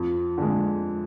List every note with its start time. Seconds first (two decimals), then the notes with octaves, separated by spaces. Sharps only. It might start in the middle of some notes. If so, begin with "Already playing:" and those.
Already playing: F2
0.38 D3 G#3